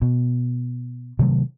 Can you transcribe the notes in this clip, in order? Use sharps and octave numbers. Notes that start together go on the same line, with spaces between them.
B2
C3 D#3 F#3 A3